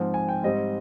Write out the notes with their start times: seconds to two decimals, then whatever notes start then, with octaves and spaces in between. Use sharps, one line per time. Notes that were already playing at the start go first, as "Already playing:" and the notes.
Already playing: G#2 F3 C4
0.14 G#5
0.29 G5
0.43 G#2 G3 C4 D#5